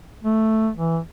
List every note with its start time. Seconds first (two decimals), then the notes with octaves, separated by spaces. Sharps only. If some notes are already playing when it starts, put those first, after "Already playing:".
0.23 A3
0.75 E3